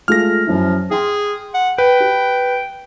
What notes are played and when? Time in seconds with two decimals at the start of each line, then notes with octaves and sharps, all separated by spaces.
0.08 G#3 A3 F4 F6 A#6
0.47 F#2 F3 E4
0.91 G#4 G5 C6
1.54 F#5
1.78 B4 G5
2.00 G4